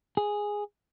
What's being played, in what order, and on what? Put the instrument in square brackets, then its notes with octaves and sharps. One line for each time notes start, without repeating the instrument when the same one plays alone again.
[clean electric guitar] G#4